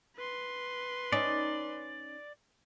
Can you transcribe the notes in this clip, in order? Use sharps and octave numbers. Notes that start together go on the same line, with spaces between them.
B4 C6
C#4 D#4 D5